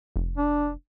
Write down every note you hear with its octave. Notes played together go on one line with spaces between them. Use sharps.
F1
D4